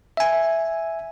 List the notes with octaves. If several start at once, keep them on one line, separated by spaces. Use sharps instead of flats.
E5 G#5